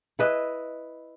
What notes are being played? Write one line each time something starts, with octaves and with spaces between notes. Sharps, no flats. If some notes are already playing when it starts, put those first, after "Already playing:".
E4 B4 D#5